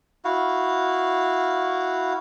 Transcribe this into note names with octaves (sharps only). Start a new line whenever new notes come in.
E4 F#4 F5